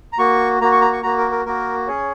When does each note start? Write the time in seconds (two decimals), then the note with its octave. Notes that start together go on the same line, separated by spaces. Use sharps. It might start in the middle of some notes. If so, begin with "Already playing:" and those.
0.13 A#5
0.18 A#3 F#4 C#6
0.61 A#3 F#4 A#5
0.72 C#6
0.81 A#5
0.93 C#6
1.03 A#3 F#4 A#5
1.18 A#4
1.31 A#4
1.46 A#3 F#4 A#4
1.87 C#4 G#4 C#5